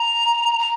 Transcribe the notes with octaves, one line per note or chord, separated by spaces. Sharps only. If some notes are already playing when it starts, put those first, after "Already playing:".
Already playing: A#5
A#5